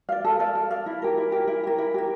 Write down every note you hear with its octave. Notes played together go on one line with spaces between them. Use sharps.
D5 F5
A4
D5 F5
A4
D5 F5
E4
G4 A#4
E4
G4 A#4
E4
G4 A#4
E4
G4 A#4